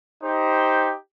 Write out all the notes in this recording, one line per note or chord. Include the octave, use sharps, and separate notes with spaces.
D#4 G4 C5